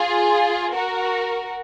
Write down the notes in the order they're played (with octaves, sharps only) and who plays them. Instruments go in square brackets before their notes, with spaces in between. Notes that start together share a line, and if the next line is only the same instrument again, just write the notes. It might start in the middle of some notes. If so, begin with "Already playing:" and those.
Already playing: [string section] F4 G#4
F#4 A#4